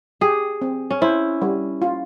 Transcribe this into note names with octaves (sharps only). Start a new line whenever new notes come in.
G4 G#4
C4
C#4
E4 C5
G3
F4